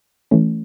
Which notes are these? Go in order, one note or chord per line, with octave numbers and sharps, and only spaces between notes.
E3 A3 C#4